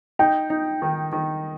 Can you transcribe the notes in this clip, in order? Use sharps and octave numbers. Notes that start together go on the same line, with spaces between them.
D#4 G5
D#4
D#3
D#3